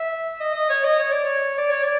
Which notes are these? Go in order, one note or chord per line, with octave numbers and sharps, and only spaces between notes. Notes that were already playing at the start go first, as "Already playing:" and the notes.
Already playing: E5
D#5
D#5
C#5
D#5
C#5
D5
C#5
D5
C#5
D5